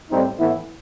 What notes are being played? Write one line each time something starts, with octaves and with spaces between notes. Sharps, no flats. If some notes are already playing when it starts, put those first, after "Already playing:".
A2 G3 C4 D#4
A2 E3 B3 E4